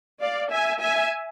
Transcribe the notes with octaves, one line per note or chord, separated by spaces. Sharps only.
D5 F5
E5 G#5
E5 G#5